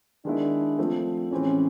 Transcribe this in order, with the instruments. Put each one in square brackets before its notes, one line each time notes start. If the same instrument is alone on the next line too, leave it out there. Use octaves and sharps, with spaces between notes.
[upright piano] D#3 G#3 B3 E4 [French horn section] D4
[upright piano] F3 A3 C4
[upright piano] A2 E3 G#3 C4 [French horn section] C#4